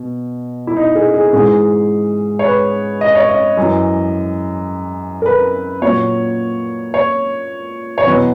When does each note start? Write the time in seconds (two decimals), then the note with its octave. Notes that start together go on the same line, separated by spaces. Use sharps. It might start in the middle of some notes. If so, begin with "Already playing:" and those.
Already playing: B2
0.67 E4
0.76 D#4
0.95 G#4
1.14 G#4
1.33 G#2 E3 G#4
2.39 C#5
2.45 B4
3.01 D#5
3.15 C#5
3.29 D#5
3.57 F#2 E3
5.22 A#4
5.26 B4
5.82 A#2 F#3 C#5
6.94 C#5
7.98 C#5
8.06 E2 B2 F#3 B4